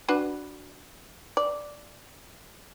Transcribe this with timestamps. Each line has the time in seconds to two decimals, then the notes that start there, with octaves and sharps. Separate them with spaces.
0.08 D4 F#4 B4
1.37 D5